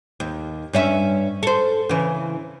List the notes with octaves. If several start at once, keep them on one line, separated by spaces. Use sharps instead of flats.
D#2
G2 C#4 E5
A4 C5
C#3 E3